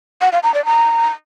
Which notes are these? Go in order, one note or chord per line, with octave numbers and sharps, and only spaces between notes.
F#5
F5
A#5
D5
A#5